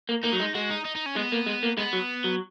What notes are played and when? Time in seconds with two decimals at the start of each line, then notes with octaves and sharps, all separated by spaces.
0.09 A#3
0.24 A#3 D#4
0.33 F#3
0.40 G#3
0.55 G#3 F#4
0.70 D#4
0.85 D#4
0.95 D#4
1.06 C#4
1.16 G#3 B3
1.32 A#3
1.46 G#3
1.63 A#3
1.78 G#3 B3
1.93 F#3
2.24 F#3